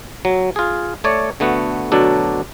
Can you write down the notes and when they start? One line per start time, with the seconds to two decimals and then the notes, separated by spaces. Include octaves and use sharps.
0.25 F#3
0.56 F4 G#4
1.04 A3 C#5 D5
1.40 D3 A3 B3 F#4
1.92 D2 B2 F#3 D4 A4